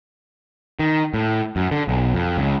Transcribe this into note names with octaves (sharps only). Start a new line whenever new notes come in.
D#3
A2
F#2
D3
B1
F2
C#2